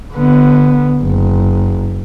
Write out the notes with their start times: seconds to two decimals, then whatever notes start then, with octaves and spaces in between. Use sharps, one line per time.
0.14 D3 B3
1.02 F#1